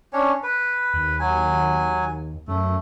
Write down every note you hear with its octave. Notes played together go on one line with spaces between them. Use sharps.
C#4 D4 C#5
B4
D#2
F#3 G#5
F#2 A3